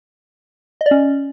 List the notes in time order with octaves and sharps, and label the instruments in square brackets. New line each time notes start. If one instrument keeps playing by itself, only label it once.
[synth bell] D#5
D5
C#4